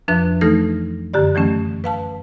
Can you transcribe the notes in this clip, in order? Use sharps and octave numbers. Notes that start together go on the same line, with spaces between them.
F2 F3 D4 B4 E5 F#6
E3 A3 D#4 A4 F6 A#6
F#2 D3 G4 D5
D#3 E3 F#3 A3 C#4
B4 F5 A5